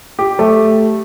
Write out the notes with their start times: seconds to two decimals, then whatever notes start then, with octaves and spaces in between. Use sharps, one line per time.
0.19 G4
0.39 A3